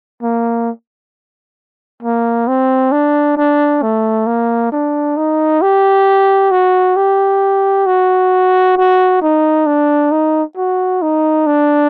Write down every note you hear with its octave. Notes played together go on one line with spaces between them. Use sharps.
A#3
A#3
C4
D4
D4
A3
A#3
D4
D#4
G4
F#4
G4
F#4
F#4
D#4
D4
D#4
F#4
D#4
D4